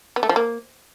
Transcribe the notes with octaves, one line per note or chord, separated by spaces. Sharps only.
B3
A3
F3
A#3